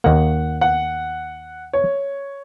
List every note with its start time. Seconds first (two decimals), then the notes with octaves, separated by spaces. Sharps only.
0.04 D#2 D#3 A#3 F#5
0.61 F#5
1.73 C#5